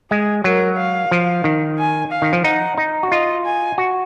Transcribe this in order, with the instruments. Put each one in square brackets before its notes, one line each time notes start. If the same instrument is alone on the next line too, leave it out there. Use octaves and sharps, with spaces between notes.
[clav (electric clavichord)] G#3 [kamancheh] G#4
[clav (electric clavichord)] F#3 [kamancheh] A#4
[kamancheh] F5
[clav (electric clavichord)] F3
D#3
[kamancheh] G#5
F5
[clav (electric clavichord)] D#3
F3
[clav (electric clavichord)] D#4 [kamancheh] F#5
[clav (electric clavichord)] D#4
F#4
[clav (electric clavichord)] F4 [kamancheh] D#5
[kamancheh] G#5
[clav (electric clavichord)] F#4